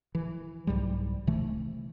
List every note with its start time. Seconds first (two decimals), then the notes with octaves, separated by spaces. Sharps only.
0.15 E3
0.67 C2 G#2 F#3 G3
1.27 C3 E3 A3